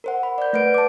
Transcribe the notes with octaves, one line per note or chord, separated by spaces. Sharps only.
A#4 C5 F#5
B5
D5 G6
A3 B4 F#5 D7
A5 D6